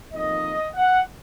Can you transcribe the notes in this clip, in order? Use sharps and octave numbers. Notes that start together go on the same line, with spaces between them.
F2 D#3 A#3 D#4 D#5
F#5